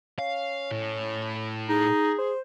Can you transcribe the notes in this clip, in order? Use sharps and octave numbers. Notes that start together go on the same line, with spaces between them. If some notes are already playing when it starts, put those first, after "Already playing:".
C#4 F5
A2
D#4 G#4
C5